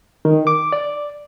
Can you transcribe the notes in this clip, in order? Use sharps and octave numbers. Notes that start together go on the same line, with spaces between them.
D#3
D6
D5